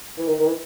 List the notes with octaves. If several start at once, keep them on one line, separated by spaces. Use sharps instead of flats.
E3
D#3
D#3
E3